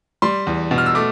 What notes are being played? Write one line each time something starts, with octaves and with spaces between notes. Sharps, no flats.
G3 C6
E2
B2
F6
E6
A3 D6